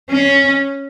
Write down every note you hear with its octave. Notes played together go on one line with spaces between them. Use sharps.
C#4